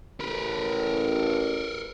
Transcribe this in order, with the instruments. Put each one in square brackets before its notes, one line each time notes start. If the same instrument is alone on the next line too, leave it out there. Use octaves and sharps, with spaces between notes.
[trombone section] A1 [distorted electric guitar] A#4 B4